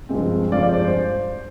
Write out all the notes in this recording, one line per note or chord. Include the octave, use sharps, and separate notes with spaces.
G2 F3 G#3 C4
G2 F3 G#3 C4 D5 F5
D5
C5
D5
C5